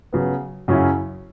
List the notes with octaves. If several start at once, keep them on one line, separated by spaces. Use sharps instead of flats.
C#3 F#3 B3
F#2 C#3 F#3 C#4 E4